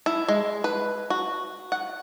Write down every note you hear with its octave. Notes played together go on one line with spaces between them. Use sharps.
E4
G#3
B4
F#4
F#5